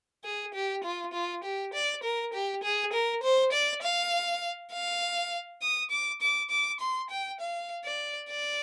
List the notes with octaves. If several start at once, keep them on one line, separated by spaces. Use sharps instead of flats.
G#4
G4
F4
F4
G4
D5
A#4
G4
G#4
A#4
C5
D5
F5
F5
D#6
D6
D6
D6
C6
G5
F5
D5
D5